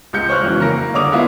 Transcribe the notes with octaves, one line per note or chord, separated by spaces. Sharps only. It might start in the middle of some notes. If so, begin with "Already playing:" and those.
C#2 G#3 G6 C#7
C5 C#5 C#6 F6 F#6
F2 C#3 E3 F#3
A#3 A#4 A#6
D3 G3 C#5 D6 D#6 F7
G#3 B3 E4 F4 E5 F5